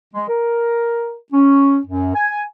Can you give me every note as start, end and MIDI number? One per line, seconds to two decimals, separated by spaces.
0.14 0.28 56
0.28 1.15 70
1.33 1.79 61
1.86 2.14 42
2.15 2.43 80